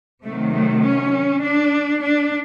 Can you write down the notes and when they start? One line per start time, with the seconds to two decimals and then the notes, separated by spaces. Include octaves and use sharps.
0.25 C3 D#3 F#3 A3
0.54 A3
0.84 C#4
1.43 D4
2.02 D4